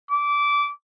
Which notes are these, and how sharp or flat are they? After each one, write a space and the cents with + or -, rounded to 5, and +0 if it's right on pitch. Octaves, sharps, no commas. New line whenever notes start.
D6 -20